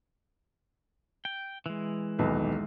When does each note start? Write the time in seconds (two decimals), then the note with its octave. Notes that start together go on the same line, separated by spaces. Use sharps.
1.25 G5
1.66 E3 G#3
2.19 D#1 B1 B4